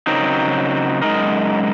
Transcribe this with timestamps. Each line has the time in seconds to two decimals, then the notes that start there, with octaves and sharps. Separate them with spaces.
0.07 C#3 F#3 C4 D#4 A#4
1.02 F#2 C#3 G#3 D#4 A#4